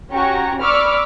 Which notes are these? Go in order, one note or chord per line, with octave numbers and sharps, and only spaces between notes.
C#4 F#4 G4 A#5 C#6
D5 B5 C#6 D6 E6 F6